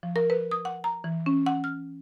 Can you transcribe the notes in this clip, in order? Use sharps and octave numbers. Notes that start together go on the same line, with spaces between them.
F3
A#4
B4
D#6
F#5
A#5
E3
C#4
F#5
F6